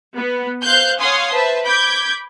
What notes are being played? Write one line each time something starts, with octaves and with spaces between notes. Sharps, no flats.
B3
C5 F5 F#6 G6
C#5 F5 F#5 G#5 C6 D#6
B4 C5 E5 A5
B5 D6 G6 G#6